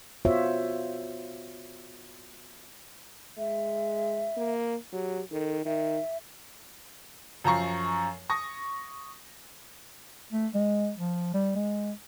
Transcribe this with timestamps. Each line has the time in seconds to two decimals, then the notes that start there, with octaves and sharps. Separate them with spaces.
0.25 B3 F4 F#4 C5 C#5 E5
3.38 G#3 E5
4.37 A#3
4.93 F#3 G4
5.32 D#3 A4
5.65 D#3 E5
7.44 F#2 F3 A#5 C#6 C7
8.30 C#6 D#6 A#6
10.32 A3
10.54 G#3
10.97 F3
11.34 G3
11.56 G#3